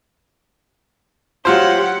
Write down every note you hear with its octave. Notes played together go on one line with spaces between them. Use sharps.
F#3 F4 G4 C5 F#5